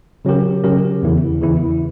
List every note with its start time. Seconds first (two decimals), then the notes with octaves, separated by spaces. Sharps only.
0.25 C#3 F#3 C#4 G4 A#4
0.64 C#3 F#3 C#4 G4 A#4
1.02 E2 C#3 E3 B3 E4
1.42 E2 C#3 E3 B3 E4